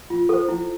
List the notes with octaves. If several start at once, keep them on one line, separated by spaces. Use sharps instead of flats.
F4
A4 C5
E4